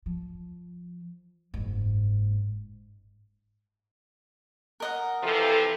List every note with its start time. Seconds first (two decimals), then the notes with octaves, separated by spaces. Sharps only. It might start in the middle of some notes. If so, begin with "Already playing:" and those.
0.06 F3
1.54 F#1 G#2
4.80 A#4 D#5 F#5
5.23 C3 E3 F3 A4